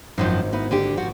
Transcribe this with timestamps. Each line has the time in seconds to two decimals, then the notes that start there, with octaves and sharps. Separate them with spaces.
0.18 G#1 F#2 D#3 F3 C7
0.53 B3 D#4 E4
0.71 D3 D4 G4
0.97 F3 F#4